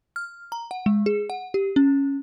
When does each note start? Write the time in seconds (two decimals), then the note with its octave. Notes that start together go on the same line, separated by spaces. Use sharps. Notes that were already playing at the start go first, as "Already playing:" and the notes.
0.16 F6
0.52 A#5
0.71 F#5
0.86 G#3
1.06 G#4
1.30 F#5
1.54 G4
1.76 C#4